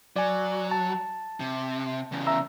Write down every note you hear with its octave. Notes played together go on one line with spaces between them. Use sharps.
F#3 D5 G#5
A5
C3
E2 C#3
E5 A#5 E6